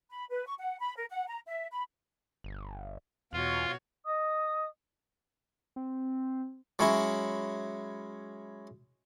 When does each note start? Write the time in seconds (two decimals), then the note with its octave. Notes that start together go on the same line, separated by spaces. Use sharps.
0.10 B5
0.30 B4
0.46 C#6
0.58 F#5
0.80 B5
0.96 A#4
1.10 F#5
1.28 A#5
1.46 E5
1.71 B5
2.44 G1
3.33 E2 B2 F4 F#4 C#5
4.06 D#5 D#6
5.76 C4
6.79 F#3 G#3 C#4 E4